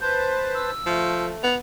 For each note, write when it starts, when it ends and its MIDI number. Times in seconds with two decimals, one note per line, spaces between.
0.01 0.71 71
0.01 0.71 72
0.01 0.71 81
0.01 0.34 91
0.55 1.27 88
0.86 1.31 53
0.86 1.44 57
1.43 1.57 59
1.43 1.55 101